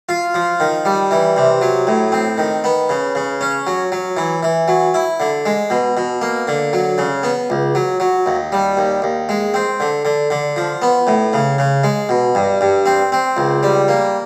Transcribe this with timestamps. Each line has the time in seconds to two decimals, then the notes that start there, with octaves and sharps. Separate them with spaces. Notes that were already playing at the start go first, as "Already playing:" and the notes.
0.09 F4
0.35 F3
0.60 D#3
0.85 G3
1.11 E3
1.37 C3
1.61 F#3
1.87 A2
2.12 C4
2.38 D#3
2.64 B3
2.89 C#3
3.15 C#3
3.41 C#4
3.67 F#3
3.92 F#3
4.17 E3
4.43 E3
4.68 F#3
4.94 E4
5.20 D3
5.46 G#3
5.70 B2
5.97 B2
6.22 A#3
6.48 D3
6.73 F#3
6.98 C#3
7.23 B3
7.50 C#2
7.75 F#3
8.00 F#3
8.26 D#2
8.52 G3
8.77 D#2
9.02 D#2
9.29 G#3
9.54 C4
9.80 D3
10.05 D3
10.30 D3
10.56 F3
10.82 B3
11.07 A2
11.33 C#3
11.58 C#3
11.84 G#3
12.09 B2
12.35 G2
12.61 G2
12.86 C4
13.12 C4
13.37 C#2
13.63 G3
13.88 A#3